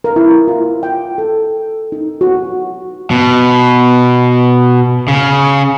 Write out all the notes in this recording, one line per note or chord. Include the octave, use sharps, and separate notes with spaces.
A#4
E4
F4
G5
A4
D#4
F#4
B2
C#3